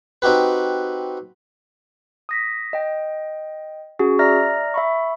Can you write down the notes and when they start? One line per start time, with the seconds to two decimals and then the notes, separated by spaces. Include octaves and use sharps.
0.22 C4 D#4 F#4 G4 B4
2.29 D#6 A#6 B6
2.73 D#5 G5
3.99 C#4 F#4 G#4
4.19 D5 E5 A#5 F6 A#6
4.74 E5 B5 C#6